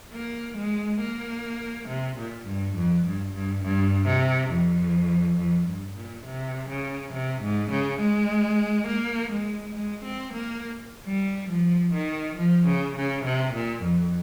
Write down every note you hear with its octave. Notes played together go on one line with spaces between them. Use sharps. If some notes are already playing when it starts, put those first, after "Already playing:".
A#3
G#3
A#3
C3
A#2
G2
F2
G2
G2
G2
C3
F2
F2
G2
A#2
C3
C#3
C3
G#2
C#3
G#3
A#3
G#3
G#3
C4
A#3
G3
F3
D#3
F3
C#3
C#3
C3
A#2
F2